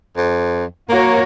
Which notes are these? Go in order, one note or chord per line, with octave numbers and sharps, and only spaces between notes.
F2
A#3 F#4 A#4 C#5